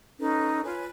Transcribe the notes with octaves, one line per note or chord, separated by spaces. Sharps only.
C#4 D#4 A4 B4
F4 B4 C#5 G#5